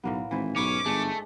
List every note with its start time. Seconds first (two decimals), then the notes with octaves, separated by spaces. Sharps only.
0.04 B1 A2 A#3 B3
0.31 G#1 E3 E4 C5
0.56 B1 G#2 C#4 B4 D6
0.86 G1 G#3 A3 D4